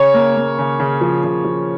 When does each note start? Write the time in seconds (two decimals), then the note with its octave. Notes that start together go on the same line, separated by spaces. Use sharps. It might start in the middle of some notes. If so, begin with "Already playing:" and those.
Already playing: C#3 C#5
0.14 A#3
0.37 A#3
0.58 C#3
0.80 C#3
1.01 F3
1.23 C#3
1.45 F3